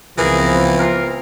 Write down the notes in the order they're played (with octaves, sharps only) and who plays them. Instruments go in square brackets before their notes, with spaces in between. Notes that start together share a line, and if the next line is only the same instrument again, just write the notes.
[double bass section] C#2 B3 C4 [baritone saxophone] E3 [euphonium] F3 [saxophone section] G#4 A#4
[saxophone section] F4 A#4